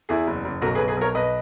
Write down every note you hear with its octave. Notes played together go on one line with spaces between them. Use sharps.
E2 E4 G#4
F#1
F#1
B1 F#4 A#4
G#4 B4
B1
G#4 B4
B1 A#4 C#5
B1 B4 D#5